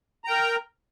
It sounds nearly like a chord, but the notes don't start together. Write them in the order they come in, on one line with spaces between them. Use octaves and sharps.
A#5 G5 A#4